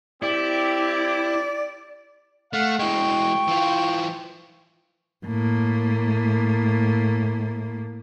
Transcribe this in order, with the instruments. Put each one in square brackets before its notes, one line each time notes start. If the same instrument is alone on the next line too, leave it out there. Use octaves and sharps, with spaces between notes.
[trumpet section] C4 G4 [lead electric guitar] E4 [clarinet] D5
[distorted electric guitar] A3 [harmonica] F5 F#5
[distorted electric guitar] E3 G#3 [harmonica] G5 C#6
[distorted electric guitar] E3 F4
[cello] A2 A#3